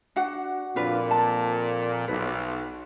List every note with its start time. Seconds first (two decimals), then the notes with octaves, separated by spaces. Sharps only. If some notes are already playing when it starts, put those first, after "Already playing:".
0.16 D4 F#4 F#5
0.76 F2 A#2 D4 F4 B4
1.11 A5
2.08 B1 B4